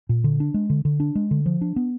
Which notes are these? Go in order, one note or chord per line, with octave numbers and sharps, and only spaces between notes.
A#2
D3
D4
G#3
D3
D3
D4
G#3
D3
F3
D4
B3